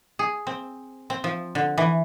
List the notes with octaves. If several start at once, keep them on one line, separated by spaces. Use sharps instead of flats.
G#4
C4
C4
F3
D3
E3